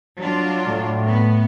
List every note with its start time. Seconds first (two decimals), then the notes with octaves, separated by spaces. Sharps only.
0.18 F#3 D4 F4
0.66 A2
1.07 B3